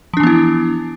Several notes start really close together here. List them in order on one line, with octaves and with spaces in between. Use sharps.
F3 D4 E3 B3 E4